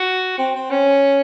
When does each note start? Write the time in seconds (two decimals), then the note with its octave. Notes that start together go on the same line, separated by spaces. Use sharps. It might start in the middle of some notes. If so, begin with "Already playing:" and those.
Already playing: F#4
0.39 C4
0.55 C4
0.71 C#4